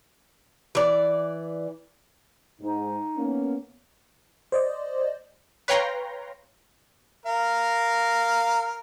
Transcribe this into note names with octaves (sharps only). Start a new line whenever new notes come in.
E3 D5
G#2 D#4
A#3 B3 C#4
C5 D5 D#5
B4 C#5 F5 G5 A#5 C6
A#4 F5